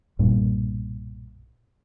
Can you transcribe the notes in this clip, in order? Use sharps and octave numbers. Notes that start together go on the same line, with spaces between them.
B1 G2 A#2